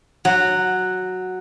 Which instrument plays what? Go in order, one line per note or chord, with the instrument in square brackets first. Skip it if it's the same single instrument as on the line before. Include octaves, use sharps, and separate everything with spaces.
[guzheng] F#3